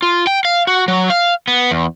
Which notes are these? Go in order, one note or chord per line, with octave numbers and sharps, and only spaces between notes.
F4
G5
F5
F#4
F#3
F5
B3
E2